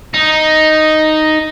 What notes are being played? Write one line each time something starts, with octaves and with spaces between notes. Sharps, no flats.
D#4